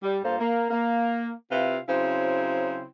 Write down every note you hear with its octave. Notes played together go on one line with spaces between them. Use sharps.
G3
G2 A#3 F4 A4 C5
A#3
A#3
C3 E4 F4 B4 F5
C#3 F#3 C4 E4 C5